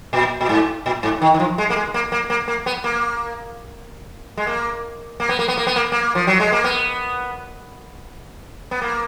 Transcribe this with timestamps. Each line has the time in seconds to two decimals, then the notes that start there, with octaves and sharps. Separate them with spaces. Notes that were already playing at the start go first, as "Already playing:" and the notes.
0.13 A#2
0.41 A#2
0.49 G#2
0.86 A#2
1.03 G#2
1.22 D#3
1.34 D#3
1.40 F3
1.58 G#3
1.70 A#3
1.76 G#3
1.94 A#3
2.12 A#3
2.30 A#3
2.48 A#3
2.66 B3
2.84 A#3
4.38 G#3
4.47 A#3
5.20 A#3
5.29 B3
5.39 A#3
5.48 B3
5.57 A#3
5.67 B3
5.76 A#3
5.92 A#3
6.15 F3
6.27 F#3
6.40 G#3
6.52 A#3
6.64 B3
8.71 B3
8.82 A#3